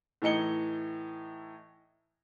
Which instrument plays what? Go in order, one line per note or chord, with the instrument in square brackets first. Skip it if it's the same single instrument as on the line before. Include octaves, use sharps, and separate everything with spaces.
[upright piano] A2 E3 D#4 C#7 G7